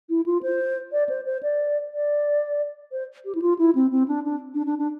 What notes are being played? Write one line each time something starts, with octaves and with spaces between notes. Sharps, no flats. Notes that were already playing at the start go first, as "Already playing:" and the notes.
E4
F4
C5
D5
C5
C5
D5
D5
C5
G4
E4
F4
E4
C4
C4
D4
D4
D4
D4
D4